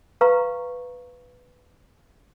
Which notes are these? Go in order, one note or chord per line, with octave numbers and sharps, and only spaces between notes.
B4 F5 A#5 C#6